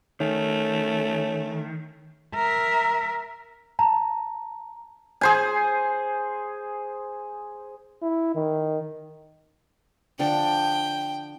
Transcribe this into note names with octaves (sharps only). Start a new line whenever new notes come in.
D#3 A3 C#4
A#4 E5
A5 A#5
G#4 C5 G#5
E4
D#3
D3 F3 D4 G5